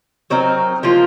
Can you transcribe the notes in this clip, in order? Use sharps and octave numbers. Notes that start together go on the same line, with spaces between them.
F#3 C4 D#4 A#4
F3 A#3 F4 C5